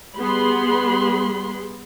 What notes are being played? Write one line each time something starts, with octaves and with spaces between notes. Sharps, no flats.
G3 B3 G#4 B5 C6